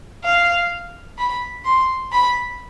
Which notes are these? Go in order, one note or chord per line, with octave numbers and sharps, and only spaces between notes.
F5
B5
C6
B5